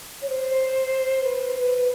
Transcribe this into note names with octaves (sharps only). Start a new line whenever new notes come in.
C#5
C5
B4
B4